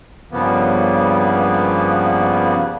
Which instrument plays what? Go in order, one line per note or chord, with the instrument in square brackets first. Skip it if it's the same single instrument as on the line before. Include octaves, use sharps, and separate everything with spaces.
[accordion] G2 C#3 F3 A#3 B3